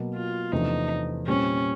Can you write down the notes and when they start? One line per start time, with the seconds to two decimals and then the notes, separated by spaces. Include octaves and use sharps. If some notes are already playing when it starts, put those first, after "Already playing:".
Already playing: B2 F#3 A#3
0.15 F4
0.52 E2 C3 F3 A3 D4 D#4
1.27 A#2 G3 C4 C#4